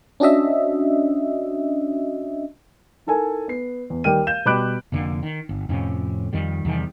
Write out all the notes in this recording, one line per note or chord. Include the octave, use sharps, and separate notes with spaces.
C#4 D4 F#4 D#5 E5
D#4 E4 A4 A#4 G#5
B3 C7
E2
D#2 G3 A#4 G5 F6 D#7
F5 G6 E7
B2 G3 B5 D6 F#6 D7
F1 F2 D3 A#3
D#3
G1
F2 A2 C3 C#4
F2 D#3 G3
E2 C3 D#3 G3